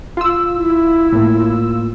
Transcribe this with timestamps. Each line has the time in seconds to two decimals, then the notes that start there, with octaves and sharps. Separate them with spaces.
0.17 F4 E6
0.55 E4
1.12 A2 A#3